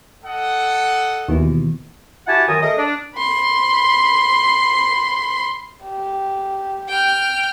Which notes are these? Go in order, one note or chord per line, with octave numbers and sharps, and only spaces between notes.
A4 D#5 F#5
D#2 B2 E3
E4 F#4 G4 F#5 G#5 A5
F#2 D#3 A#4 G#5 A#5 D#6
A3 G#4 A#4 D#5
D4
B5 C6
G4
G5 F6